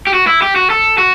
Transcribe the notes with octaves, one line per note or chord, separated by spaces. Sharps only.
G4
F#4
E4
G4
F#4
A4
F#4